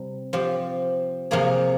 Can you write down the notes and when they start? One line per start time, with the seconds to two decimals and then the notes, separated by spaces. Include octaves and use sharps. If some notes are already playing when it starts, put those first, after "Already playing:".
Already playing: C3 G3
0.33 F3 C4 G4
1.31 C3 F3 A#3 F4 G#4